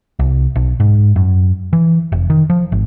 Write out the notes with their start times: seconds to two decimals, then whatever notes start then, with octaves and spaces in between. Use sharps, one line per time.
0.19 C2
0.56 B1
0.80 G#2
1.16 F#2
1.73 E3
2.12 F1
2.30 D#3
2.50 F3
2.72 G#1